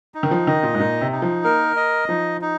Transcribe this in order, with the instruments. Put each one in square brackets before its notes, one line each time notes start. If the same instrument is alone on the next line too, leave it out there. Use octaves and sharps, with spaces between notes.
[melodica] D#4
[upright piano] D#3
F3
[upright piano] D#3 [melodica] D#5
[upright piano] A#2
G#2
[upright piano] A#2 [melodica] D#4
[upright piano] C3
[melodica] D#4
[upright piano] F3
[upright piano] A#3 [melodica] A#4
[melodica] D#5
[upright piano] F3 [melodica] D#4
[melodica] D#4